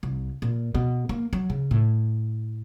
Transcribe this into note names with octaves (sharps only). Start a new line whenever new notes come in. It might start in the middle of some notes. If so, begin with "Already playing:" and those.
C2
A#2
B2
A#3
F#3
C#3
A2